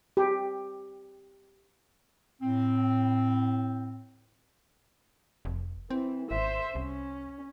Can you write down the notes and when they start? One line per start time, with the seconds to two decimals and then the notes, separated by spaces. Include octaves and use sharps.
0.17 G4
2.41 A2 C4
5.45 F1
5.90 E3 C4
6.31 G#1 C5 E5
6.75 C2 C#4